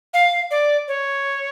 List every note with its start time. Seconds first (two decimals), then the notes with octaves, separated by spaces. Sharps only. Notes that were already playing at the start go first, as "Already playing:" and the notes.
0.14 F5
0.51 D5
0.88 C#5